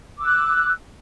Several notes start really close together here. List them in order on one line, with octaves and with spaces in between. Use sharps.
D6 E6 F#6